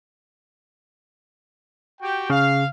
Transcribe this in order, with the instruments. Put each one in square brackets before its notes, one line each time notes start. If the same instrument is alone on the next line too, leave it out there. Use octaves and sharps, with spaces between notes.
[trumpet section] F#4 G4 G5
[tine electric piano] C#3 [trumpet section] F5